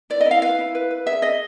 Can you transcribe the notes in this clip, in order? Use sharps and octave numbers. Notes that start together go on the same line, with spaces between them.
E4 D5
E4 D#5
F5
B4 F5
E4
B4
B4
G#4 E5
G#4 D#5